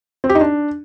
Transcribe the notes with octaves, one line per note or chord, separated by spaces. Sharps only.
C4
G4
D#4
D4